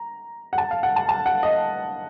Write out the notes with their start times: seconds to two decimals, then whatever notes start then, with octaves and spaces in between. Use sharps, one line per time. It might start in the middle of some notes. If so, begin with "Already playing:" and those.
Already playing: A#5
0.53 F#5
0.58 A5
0.71 F5
0.83 F#5
0.96 A5
1.09 A5
1.26 F#5
1.43 D#5